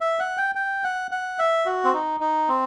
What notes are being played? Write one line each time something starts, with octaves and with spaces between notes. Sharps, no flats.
E5
F#5
G5
G5
F#5
F#5
E5
F#4
C4
D#4
D#4
C4